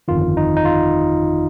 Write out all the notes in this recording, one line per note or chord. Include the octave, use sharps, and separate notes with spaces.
G1 F2 D#3 F4
D#4
D#4
F4